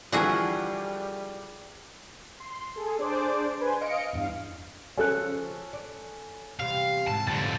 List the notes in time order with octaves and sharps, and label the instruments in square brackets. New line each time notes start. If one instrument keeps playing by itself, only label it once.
[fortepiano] D3 E3 F3 [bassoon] G3 [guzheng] F#4 G#4 E5
[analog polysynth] C6
G#4 A4
D4 G#4 C5 D5 D6
B4 C5 G#5 C6
D#5 F5 C#7 D7
E2 G2 F5
[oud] C#3 F3 [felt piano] C#4 A4 F#6
[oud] D5
[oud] E2 C3 G3 [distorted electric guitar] F5
[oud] G#2 C3 E3 [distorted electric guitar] A5
[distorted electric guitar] F2 D3 [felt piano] A6